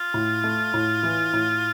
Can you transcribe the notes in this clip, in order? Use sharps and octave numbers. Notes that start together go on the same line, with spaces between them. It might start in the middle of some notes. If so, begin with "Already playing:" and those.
Already playing: F4
A2
A3
A2
E3
A2